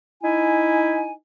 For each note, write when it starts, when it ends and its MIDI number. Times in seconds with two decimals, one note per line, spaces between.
0.22 1.11 63
0.22 1.11 64
0.22 1.11 80